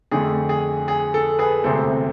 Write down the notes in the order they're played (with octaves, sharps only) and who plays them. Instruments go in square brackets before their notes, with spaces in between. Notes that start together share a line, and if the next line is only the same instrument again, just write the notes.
[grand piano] F2 D3 A3 D4 G#4
G#4
G#4
A4
G#4 B4
E1 D2 C3 A4 C5